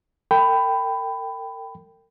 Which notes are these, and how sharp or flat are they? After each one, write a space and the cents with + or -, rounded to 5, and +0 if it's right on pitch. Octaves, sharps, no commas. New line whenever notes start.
A#4 -40 G5 +0 B5 +15